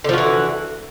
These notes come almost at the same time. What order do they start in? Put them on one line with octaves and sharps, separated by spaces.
D3 F3 F#4 E3